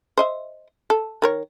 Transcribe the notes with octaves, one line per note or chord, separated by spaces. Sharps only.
C5 D#5 E5
A4
D#3 A#4 C#5